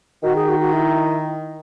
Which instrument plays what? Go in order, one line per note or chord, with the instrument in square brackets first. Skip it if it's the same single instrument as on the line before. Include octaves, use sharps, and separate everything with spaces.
[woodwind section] D#3 [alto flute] F#4
[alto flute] G#4
F#4
F#4
E4